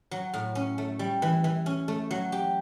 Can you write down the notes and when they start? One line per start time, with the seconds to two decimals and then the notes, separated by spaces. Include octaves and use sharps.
0.11 F#3
0.34 A2
0.55 C#4
0.78 A3
0.99 G3
1.22 E3
1.44 E3
1.66 C#4
1.88 A3
2.11 F#3
2.32 G4